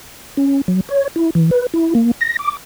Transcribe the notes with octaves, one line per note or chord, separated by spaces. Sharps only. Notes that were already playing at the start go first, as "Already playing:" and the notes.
C#4
F#3
C#5
E4
E3
B4
E4
A#3
A#6
D6